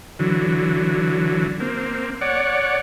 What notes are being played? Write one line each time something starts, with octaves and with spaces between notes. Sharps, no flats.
D3 E3 F#3
A#3 C4
C#5 D5 F#5